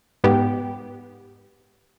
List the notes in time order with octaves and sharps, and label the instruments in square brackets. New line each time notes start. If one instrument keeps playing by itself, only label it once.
[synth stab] G#2 B3 G4